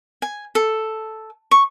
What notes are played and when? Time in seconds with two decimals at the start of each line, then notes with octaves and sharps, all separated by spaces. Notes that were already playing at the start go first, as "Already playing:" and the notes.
0.22 G#5
0.55 A4
1.51 C#6